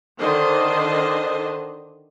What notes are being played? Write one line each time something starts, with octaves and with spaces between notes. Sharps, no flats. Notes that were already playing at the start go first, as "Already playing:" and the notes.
D3 D#3 D4 C5 D#5